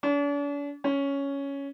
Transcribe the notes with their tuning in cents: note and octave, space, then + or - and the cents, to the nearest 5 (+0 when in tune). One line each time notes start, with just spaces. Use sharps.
D4 -45
C#4 +5